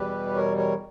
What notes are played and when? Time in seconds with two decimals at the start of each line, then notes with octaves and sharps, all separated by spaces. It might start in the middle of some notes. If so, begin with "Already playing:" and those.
Already playing: E2 B2 G3 G4 B4
0.35 A#4 C#5
0.57 A#4 C#5